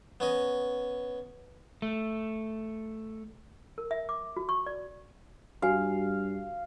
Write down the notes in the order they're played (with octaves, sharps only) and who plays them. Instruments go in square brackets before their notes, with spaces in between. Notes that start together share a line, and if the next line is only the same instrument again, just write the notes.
[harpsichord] B3 C#4 D#5
[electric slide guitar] A3
[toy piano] A#4
E5
D6
F#4
C#6
D5
[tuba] G2 [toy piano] F#4 G#5 [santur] F5